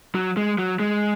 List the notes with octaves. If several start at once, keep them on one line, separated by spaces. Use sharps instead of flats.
F#3
G#3
F#3
G#3